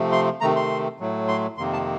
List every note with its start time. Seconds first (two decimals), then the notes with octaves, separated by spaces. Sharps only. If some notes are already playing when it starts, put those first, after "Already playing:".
Already playing: C3 F3 A3
0.12 C6
0.41 C3 D#3 A3 A#5
0.56 C6
1.00 A2 F#3 A3
1.28 C6
1.58 F2 C3 D#3 A#3 C6
1.73 A5